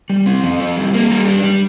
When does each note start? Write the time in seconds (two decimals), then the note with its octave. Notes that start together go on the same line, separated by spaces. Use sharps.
0.10 G3
0.26 C4
0.43 F3
0.60 C4
0.76 G3
0.94 A#3
1.10 G3
1.27 D4
1.43 G3